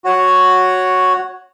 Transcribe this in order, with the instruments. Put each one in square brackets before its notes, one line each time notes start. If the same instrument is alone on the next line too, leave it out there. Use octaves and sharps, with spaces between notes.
[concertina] F#4 C#5 F#5